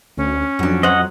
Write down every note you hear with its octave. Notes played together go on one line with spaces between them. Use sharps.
D2 C#4
F2 F#3 D4
F#3 C5 D#5 F#5